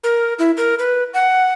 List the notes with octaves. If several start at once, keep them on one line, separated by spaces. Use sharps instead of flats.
A#4
E4
A#4
B4
F#5